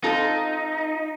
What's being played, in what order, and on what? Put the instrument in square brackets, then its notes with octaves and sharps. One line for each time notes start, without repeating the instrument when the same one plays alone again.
[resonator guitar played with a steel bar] C4 F4 A4 [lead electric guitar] D#4